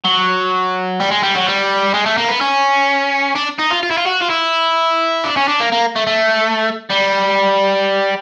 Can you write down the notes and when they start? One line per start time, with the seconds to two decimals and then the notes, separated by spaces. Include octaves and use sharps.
0.05 F#3
1.00 G3
1.11 G#3
1.23 G3
1.35 F#3
1.46 G3
1.94 G#3
2.06 A3
2.17 A#3
2.29 B3
2.41 C#4
3.36 D4
3.59 D#4
3.71 F4
3.83 F4
3.91 E4
3.98 F4
4.06 F#4
4.22 F4
4.30 E4
5.24 D4
5.36 C#4
5.48 D4
5.60 A#3
5.72 A#3
5.96 A3
6.07 A3
6.90 G3